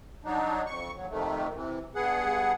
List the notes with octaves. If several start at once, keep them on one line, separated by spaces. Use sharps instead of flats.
F#3 D4 D#4
F2 C#6
D#2 F#3
F2 C3 D#3 A3
C3 E3
G2 B3 G#4 F#5